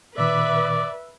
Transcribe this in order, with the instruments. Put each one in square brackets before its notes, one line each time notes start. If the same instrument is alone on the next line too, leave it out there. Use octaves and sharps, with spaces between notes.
[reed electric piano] A#2 D#3 [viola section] B4 E5 [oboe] D5 [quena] D6